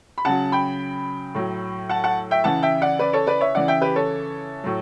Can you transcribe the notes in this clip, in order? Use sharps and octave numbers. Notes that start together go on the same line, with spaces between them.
B5
C#3 F#3 F#5 A5
G5 B5
A2 F#3
F#5 A5
F#5 A5
E5 G5
C#3 E3 F#5 A5
E5 G5
D5 F#5
B4 D5
A4 C#5
B4 D5
C#5 E5
C#3 E3 D5 F#5
E5 G5
G4 B4
A4 C#5
A2 F#3